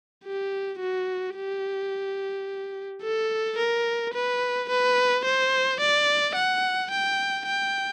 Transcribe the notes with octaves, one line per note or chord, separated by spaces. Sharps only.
G4
F#4
G4
A4
A#4
B4
B4
C5
D5
F#5
G5
G5